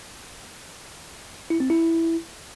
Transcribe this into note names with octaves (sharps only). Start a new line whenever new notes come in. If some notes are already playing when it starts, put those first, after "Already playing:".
E4
C4
E4